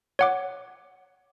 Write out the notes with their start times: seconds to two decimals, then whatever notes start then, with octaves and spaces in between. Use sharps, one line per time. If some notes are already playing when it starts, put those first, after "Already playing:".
0.19 C#5 F#5 D6